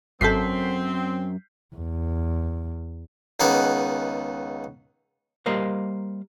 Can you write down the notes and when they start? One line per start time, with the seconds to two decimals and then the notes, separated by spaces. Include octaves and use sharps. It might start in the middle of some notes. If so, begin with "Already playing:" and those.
0.21 G#1 F#2 C4 A4 G6 B6 C7
1.76 E2
3.40 C#2 D#3 B3 G#4 F#5 D6
5.46 G3 A#3 A#4 C5 D#5 F5